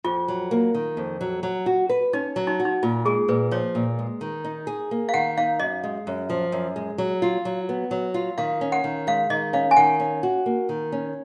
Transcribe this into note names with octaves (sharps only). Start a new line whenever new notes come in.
F2 F4
F#3
A#3
D#3
F2
F#3
F#3
F#4
B4
C#4 D#4
F#3
D#4
F#4
D#4
A#2 F4
G#3 G#4
A#2 B4
F3 C#5
A#2
G#3
D#3
D#4
G#4
A#3
F5
D#3 F#5
D#4 F5
F#2 D#5
G#3
F#2
F3
F#2
G#3
F#3
F4
F#3
B3
F#3
F4
D#3 F5
C#4
F#5
D#3
G#3 F5
D#3 D#5
C#4 F5
G#5
D#3 F#5
C#4
F#4
A#3
D#3
C#4